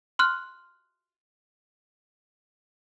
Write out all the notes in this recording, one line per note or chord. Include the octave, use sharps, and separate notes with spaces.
C6 F6 F#6